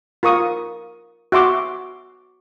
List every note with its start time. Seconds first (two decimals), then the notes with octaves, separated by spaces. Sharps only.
0.23 F4 A#4 C#6 D#6
1.32 F#4 E5 C6 D6